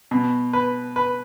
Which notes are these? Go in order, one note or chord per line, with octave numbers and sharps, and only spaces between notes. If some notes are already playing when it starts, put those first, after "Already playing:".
B2
B4
B4